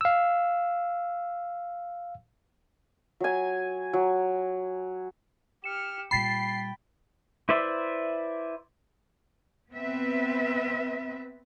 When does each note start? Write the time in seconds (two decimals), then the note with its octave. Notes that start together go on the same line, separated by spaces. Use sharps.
0.01 F5 E6
3.20 F#3 G#5
3.93 F#3
5.64 G4 F6 C#7 E7
6.11 A#2 G3 G5 B5 A6 B6 C7
7.49 E4 B4 C5 D5 E5
9.71 B3 C4 B4 E5